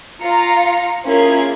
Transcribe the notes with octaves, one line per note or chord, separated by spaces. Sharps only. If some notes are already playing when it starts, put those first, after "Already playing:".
F4 A#5 C#7
A#3 C#4 E4 F4 G#4 G#6